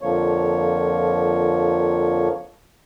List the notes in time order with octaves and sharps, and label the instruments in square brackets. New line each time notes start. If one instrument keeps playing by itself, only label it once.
[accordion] F2 D3 F3 A#3 C#5